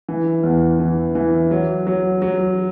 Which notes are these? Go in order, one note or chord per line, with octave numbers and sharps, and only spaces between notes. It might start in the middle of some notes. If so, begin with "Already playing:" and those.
E3
E2
E3
E3
F#3
F#3
F#3